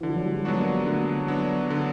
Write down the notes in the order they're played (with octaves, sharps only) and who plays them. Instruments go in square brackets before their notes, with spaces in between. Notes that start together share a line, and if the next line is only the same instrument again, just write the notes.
[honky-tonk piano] E3
[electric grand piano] D3
[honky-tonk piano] F3
F#3
G3
G#3
[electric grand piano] F#3 B3 D4 F#4
[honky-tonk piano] A#3
A#3
[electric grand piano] D3 [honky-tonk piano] A3
[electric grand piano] F#3 B3 D4 F#4
D3